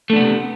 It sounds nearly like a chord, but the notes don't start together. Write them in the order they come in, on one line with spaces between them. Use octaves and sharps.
A3 D4 B3 C3